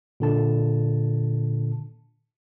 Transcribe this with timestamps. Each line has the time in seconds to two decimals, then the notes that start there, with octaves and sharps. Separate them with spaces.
0.20 A#2 D3 A5